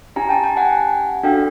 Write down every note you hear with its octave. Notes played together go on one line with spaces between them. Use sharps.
C#4 E4 G4 G#5 A#5
G5 A5
G5 A5
F#5 G#5
D4 F#4 A4 F5 G5